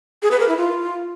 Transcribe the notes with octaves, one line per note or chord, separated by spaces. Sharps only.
G#4
B4
A#4
E4
F4